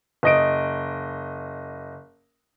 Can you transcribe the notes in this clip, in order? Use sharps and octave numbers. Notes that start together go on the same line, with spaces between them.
F#1 D#5 D7